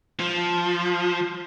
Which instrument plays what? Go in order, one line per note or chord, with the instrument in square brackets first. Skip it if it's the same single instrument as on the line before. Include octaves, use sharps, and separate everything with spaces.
[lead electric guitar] F3